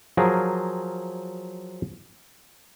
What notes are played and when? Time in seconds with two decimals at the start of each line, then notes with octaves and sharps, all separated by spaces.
0.17 F3 F#3 G#4 A#4 F5